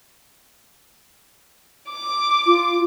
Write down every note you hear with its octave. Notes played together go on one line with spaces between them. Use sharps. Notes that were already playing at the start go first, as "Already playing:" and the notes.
D6
F4